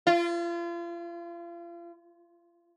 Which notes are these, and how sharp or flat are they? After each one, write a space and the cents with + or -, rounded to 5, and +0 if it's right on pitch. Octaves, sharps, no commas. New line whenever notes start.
F4 -35